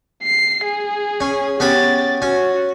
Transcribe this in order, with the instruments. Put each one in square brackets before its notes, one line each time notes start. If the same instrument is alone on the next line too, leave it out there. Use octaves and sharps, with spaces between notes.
[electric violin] C7
G#4
[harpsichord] C#4
[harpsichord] B3 C#4 B5 [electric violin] G4 A6
[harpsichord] C#4 [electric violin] F#4